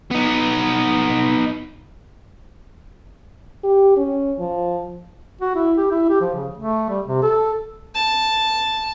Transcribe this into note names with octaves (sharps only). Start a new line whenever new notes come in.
B3 D#4
G4
C#4
F3
F#4
E4
G4
E4
G4
F3
C#3
A3
G3
C3
A4
A5